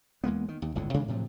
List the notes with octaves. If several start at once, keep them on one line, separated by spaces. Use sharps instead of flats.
E2 G#3 A#3 B3
D#3
D#2
G1 C#2 A2 D3
C3 D#3 G#3 D4
A2 C3 F3 F#3